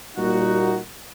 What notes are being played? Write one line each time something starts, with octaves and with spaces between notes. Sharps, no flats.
A#2 G3 A#3 D#4 F#4